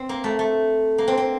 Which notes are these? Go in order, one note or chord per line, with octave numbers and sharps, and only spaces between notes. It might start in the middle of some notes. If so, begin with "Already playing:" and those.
Already playing: C4
A#3
A3
A3
A#3
C4
C4